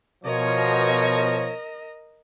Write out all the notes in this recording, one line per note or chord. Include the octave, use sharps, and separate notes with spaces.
B2 F3 A#4 C#5 D#5